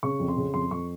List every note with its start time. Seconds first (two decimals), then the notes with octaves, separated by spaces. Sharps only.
0.03 C#3 C#6
0.20 F2
0.28 C6
0.37 C#3
0.54 F2 C6
0.71 F2 C#6